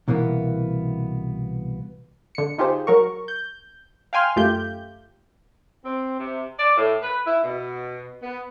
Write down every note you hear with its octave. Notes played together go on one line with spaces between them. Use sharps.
C2 B2 E3 A#3 B3
D3 C#7
D#4 F4 G4 G#4 C5
F#3 A#4 C#6
G6
F5 G5 G#5 C6 F6
F#2 A3 F4 G4 G6
C4
C3
D5
A2
B4
E4
B2
B3